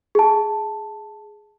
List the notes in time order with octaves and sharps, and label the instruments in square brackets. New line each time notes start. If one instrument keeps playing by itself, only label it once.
[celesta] G#4 A5